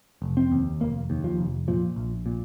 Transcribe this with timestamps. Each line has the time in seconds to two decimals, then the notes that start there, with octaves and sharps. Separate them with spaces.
0.22 F1
0.37 C4
0.51 D#2
0.81 F1 A#3
1.10 D#2
1.24 F3
1.38 F1
1.68 A#2 F3
1.96 A#1
2.26 A#2